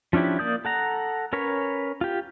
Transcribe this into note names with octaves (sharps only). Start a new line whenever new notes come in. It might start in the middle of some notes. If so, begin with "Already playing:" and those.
F3 C#4 D4 E4 G4
A#3 D5 D#6 G6
A4 F#5 A#5
C#4 A#4 B4 C#5
F4 G4